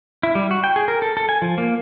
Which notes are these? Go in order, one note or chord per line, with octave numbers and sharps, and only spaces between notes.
E4
G3
F#4
G5
G#4
A#4
A4
A4
G#5
F3
A#3